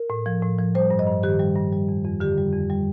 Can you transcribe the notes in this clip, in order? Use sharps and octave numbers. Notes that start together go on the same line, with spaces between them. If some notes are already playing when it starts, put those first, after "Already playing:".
Already playing: A#4
A2
F3
A2
F3
G3 C5
G2
D#5
G2
D#3 G4
G3
G2
G3
F2
F2
D3 G4
G3
F2
G3